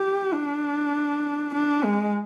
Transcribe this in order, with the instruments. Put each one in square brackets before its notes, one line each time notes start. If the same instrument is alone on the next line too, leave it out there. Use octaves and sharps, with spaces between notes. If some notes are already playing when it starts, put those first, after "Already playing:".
Already playing: [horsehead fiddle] G4
D4
D4
G#3